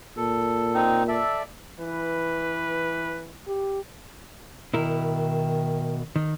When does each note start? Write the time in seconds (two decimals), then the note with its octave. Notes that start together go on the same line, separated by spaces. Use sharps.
0.17 A#2 A4
0.74 C4 D#4
1.08 A4 D5 E5
1.80 E3 B4
3.47 G4
4.74 B2 D#3 E4 A#4
6.16 D#3